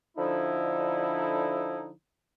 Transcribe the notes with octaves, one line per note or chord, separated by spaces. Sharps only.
D3 F3 D#4 E4